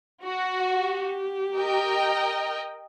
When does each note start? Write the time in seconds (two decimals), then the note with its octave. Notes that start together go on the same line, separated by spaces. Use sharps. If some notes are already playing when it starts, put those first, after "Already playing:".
0.24 F#4 F#5
0.77 G4
1.56 A#4 D#5 G5